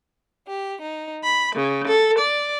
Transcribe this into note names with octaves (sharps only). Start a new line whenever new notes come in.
G4
D#4
B5
C#3
A4
D5